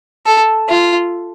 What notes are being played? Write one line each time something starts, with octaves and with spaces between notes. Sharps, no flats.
A4
F4